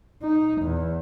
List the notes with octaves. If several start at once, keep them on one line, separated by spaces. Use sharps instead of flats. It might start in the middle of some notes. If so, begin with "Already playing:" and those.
D#4
E2